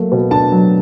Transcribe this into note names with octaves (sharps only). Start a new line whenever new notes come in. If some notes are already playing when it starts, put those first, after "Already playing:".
Already playing: F#3 A3 A#3
B2
D4 A5
F#3